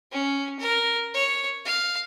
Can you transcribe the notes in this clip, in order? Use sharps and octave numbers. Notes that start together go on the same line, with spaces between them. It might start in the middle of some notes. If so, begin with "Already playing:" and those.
C#4
A#4
C#5
F5